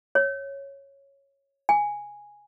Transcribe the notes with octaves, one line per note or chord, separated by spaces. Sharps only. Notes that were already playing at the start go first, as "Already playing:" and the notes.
C#5
G#5